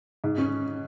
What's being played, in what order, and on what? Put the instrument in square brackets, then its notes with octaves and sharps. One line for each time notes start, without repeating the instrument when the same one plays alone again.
[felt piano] G#2
C#4